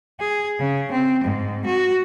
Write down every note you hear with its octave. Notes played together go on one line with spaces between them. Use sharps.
G#4
C#3
C4
G#2
F#4